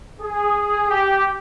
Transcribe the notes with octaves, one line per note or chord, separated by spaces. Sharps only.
G#4
G4